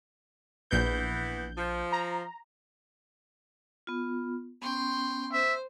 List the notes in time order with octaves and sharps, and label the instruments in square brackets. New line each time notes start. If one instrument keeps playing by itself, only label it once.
[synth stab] A#1 G6 [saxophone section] E3 B3
[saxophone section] F3
[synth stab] A#5
[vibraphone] B3 F4
[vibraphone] B3 C#4 [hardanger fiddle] G5 C6
[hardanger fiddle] C5 [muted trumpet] E5